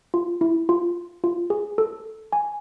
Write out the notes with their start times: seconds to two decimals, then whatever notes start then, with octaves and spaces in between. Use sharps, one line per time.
0.14 F4
0.41 E4
0.69 F4
1.24 F4
1.50 G#4
1.78 A4
2.32 G#5